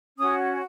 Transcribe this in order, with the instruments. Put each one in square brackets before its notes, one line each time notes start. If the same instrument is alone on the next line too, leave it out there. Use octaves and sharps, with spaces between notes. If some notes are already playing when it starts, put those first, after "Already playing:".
[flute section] C#4 F#4 D#6